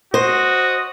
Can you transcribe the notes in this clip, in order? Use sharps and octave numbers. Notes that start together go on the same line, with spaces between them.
F#4 C5 D#5